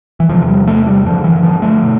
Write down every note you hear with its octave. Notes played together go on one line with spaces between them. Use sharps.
E3
E2 C3 F3
G3
A3
G3
G2 D3 F3
E3
F3
A3
B2